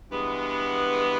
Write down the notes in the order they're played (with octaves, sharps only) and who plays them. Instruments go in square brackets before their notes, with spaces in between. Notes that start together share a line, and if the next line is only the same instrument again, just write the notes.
[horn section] G2 E3 G#3 B3